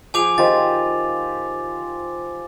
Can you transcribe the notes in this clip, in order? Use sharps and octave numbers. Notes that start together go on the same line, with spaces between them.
F3 G#4 G5 G#5 D6 F7
D#3 F4 G4 C5 A6